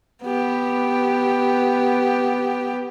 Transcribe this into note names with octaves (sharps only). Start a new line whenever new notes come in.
B3 G4